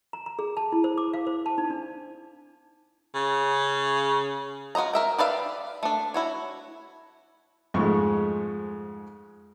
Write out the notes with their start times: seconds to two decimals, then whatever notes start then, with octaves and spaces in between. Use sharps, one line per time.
0.13 A#5
0.26 A#5
0.39 G#4
0.57 A5
0.72 E4
0.84 C5
0.98 D6
1.14 F5
1.27 C5
1.46 A5
1.58 D#4
1.70 D4
3.15 C#3
4.75 F4 F#4 C5 D#5 A#5
4.93 A#4 E5 G5
5.18 G4 B4 D5 E5 F5
5.83 A3 D4
6.14 E4 F#4 C#5
7.74 F2 G#2 G#3 A3 C#6